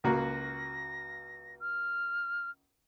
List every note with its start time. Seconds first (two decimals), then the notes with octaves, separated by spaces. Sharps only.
0.04 C#2 A#3 F#4 A#6
1.60 F6